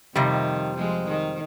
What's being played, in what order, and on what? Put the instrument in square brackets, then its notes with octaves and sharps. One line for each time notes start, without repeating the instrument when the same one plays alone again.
[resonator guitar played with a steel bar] F2 C3 G3 [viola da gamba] D#3
[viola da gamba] F3 G#3
D#3